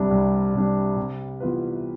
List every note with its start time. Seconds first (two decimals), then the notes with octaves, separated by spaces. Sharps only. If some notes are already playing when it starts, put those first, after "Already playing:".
Already playing: C2 C3 G3 D4
0.11 C2
0.54 C3 G3 D4
0.96 C3
1.40 E3 B3 F4 B4